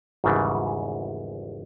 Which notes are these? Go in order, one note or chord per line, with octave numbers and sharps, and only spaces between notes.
G#1 E2 G#2 C#3 E3 G3